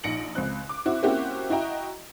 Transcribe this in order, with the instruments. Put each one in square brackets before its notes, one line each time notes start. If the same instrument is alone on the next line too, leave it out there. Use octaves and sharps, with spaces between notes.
[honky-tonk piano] A#1 D#4 A#6 C#7 D7 F#7
C#2 C4 F#6
D6
C4 E4 F#4
A#3 C4 C#4 E4 F#4 G4
E4 F#4 D#5 G5 A#5